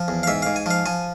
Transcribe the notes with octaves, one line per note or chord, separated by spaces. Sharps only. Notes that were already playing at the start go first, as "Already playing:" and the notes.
Already playing: F3
E2
F5
G#2 E5
G#2 F5
G#5
F3 F5
F3 G#5